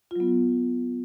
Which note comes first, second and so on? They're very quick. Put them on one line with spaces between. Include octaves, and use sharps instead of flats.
F4 F#3 B3